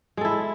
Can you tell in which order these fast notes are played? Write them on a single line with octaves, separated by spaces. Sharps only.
G#3 A4 E4